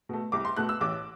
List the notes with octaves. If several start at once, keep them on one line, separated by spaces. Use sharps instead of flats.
B2 A3
C2 D6
C6
B2 A3 F#6
E6
A1 D6